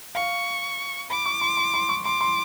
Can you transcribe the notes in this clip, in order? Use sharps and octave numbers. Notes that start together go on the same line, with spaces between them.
F5 C#6
B5 D6
C#6
C6
C6
C6
C#6
C6 D6
C6